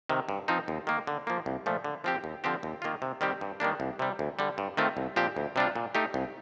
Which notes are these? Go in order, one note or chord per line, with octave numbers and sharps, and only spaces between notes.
C3 D#3
G2
F3 C4 D#4
D#2
D#3 A#3
D3
F3 A#3
C2
A#2 F3 A3
D3
F3 C4 G4
D#2
D3 F3 C4 G4
D#2
D#3 A#3 F4
C3
D#3 G3 C4 G4
G2
D#3 G3 A#3 D4
C2
C3 G3
D2
D3 G3
G2
D#3 A3 C4 F4
C2
A#2 F3 C4 G4
D2
C3 G3 D4 F4
A#2
A3 D#4 G4
C2